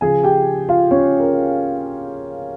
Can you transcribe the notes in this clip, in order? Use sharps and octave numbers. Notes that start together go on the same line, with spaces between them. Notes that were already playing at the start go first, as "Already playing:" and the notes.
C#3 F3 G#4 G#5
G4 G5
F4 F5
C#4 C#5
A#4